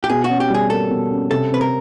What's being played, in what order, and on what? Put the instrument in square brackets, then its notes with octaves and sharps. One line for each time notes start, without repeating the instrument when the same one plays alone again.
[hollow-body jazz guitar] G4
[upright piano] B2 [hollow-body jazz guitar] G#4
[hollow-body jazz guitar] F#4
[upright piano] C#4
[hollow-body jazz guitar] G4
[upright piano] G3 [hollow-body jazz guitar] G#4
[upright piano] A#3 [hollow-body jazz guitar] A4
[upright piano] B2
C#4
[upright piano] C3 [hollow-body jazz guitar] A4
[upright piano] C4 [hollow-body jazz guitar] B4
[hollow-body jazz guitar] A#4